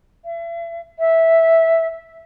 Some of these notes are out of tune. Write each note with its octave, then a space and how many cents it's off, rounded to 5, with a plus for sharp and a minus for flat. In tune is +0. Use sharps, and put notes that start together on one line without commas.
E5 +35
E5 -10